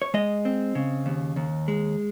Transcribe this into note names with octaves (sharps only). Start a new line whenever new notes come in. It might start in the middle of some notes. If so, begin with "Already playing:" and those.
C#5
G#3 D#5
C4
C#3
D#2
D#2
G#3